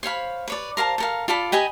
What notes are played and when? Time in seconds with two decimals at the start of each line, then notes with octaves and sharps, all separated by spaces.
0.03 C5 C#5 F5 B5
0.48 B4 C#5 D5
0.77 A#4 C5 F5 A5
0.98 A4 A#4 F5
1.28 F4 A4 D5 B5
1.52 G4 D#5 G#5 B5